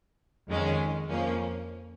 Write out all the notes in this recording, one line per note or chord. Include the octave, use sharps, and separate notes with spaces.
F2 D#3 G#3 C#4
F2 F3 A#3 C#4